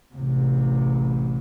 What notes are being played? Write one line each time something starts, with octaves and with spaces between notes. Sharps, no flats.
A1 C3